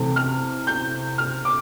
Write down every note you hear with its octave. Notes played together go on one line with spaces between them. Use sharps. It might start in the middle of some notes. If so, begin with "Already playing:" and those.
Already playing: C3 E3 A3 C4
F6
G6
F6
D6